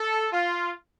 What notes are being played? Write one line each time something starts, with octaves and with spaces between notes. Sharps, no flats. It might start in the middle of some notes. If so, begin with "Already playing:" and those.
Already playing: A4
F4